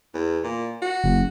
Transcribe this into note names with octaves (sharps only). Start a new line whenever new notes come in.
E2
A#2
F#4
F#1